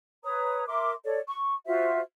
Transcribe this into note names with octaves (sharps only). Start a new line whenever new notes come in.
B4 C#5 A#5 D#6
A#4 E5 C6 D6
A4 C#5 D5
C#6
F4 F#4 C5 E5